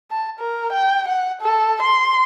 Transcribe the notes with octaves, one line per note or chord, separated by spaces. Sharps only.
A5
A#4
G5
F#5
A4
C6